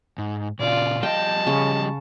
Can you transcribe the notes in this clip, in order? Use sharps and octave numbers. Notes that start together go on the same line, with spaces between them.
G#2
A#2 C#3 F4 D5
F3 G3 D#5 G5 A5
C#3